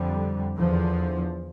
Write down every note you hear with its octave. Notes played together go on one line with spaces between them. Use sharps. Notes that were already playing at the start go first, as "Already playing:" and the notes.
Already playing: F2 D3 G3
E2 D3 F3